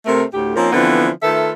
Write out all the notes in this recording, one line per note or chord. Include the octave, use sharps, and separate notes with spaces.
C3 A3 A#4
D2 A2 G4
F3 A#3 C4 C#4 D#4 A#4
D3 E3 F3 B3 C4
D#3 A3 F4 A4 B4 E5